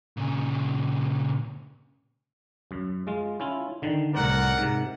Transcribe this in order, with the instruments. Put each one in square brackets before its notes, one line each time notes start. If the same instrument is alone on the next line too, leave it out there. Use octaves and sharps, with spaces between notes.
[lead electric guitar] A#2 C#3
[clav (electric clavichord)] F#2
G#3 F4
C#4 E4 F4
D3 D#3
[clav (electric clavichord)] C2 A2 C4 [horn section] A#4 D5 F#5
[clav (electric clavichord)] G#2 C3